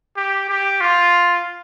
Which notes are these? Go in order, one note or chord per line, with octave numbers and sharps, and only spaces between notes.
G4
G4
F4